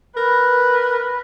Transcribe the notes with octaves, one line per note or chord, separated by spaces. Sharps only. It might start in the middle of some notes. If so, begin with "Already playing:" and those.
A#4 B4